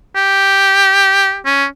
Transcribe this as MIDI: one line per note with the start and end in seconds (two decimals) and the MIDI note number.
0.15 1.38 67
1.46 1.66 61